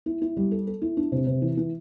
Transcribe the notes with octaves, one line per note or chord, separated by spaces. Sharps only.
E4
E4
G3
A4
A4
E4
D4
C3
C3
E3
E3